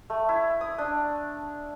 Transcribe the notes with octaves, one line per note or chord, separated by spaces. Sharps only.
A3
E4
D#6
D4